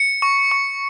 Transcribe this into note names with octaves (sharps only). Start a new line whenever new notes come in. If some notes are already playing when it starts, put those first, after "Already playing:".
Already playing: C#7
C#6
C#6